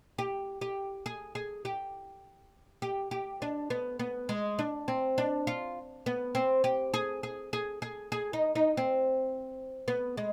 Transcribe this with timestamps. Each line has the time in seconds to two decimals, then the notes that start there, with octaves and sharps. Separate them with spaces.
0.18 G4
0.61 G4
1.06 G#4
1.35 G#4
1.65 G4
2.82 G4
3.11 G4
3.42 D4
3.70 B3
3.99 B3
4.29 G#3
4.59 D4
4.88 C4
5.18 D4
5.47 F4
6.06 B3
6.35 C4
6.64 G4
6.94 G#4
7.23 G#4
7.53 G#4
7.82 G#4
8.12 G#4
8.33 D#4
8.55 D#4
8.77 C4
9.88 B3
10.17 G#3